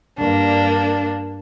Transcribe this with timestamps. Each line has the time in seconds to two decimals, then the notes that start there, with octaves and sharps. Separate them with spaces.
0.18 G2 A#3 D4